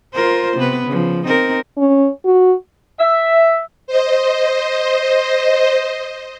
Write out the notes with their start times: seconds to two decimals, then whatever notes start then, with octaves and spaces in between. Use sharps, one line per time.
0.13 F4 A#4 C5
0.57 C3 B3 B4
0.87 C#3 F3
1.26 C4 D#4 A#4
1.78 C#4
2.25 F#4
2.99 E5
3.87 C5 D#5